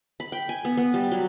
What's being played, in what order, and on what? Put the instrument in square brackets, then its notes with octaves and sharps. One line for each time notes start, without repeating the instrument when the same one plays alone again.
[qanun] B5
G5
G#5
B3
B3
G3
F#3